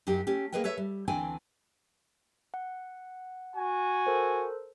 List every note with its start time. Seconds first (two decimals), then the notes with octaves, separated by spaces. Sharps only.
0.07 F#2 F#3 D#4 G4
0.27 A3 C#4 G4
0.52 A#3 G#4 A#4 B4 D#5 G5
0.64 A4 B4 C#5 E5
0.77 G3
1.08 D2 E3 C4 D4 G5 G#5
2.54 F#5
3.56 F#4 G#5
4.06 A4 A#4 C5